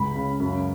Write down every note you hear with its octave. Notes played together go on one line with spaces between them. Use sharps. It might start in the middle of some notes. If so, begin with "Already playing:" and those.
Already playing: C#2 B5
C#3
F#2